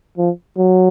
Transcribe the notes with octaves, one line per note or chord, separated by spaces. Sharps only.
F3
F#3